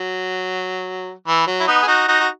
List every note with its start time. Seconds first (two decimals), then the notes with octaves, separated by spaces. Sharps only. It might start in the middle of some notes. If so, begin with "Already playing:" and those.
Already playing: F#3
1.28 E3
1.47 F#3
1.60 E4
1.67 B3 D#4
1.82 G#4
1.88 D#4 F#4
2.08 D#4 F#4
2.20 F#4